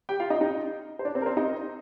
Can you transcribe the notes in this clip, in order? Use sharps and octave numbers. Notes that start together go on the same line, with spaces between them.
G4 G5
F4 F5
D#4 D#5
D#4 D#5
C5
D4 D5
C4 C5
A#4
C4 C5
D#4 D#5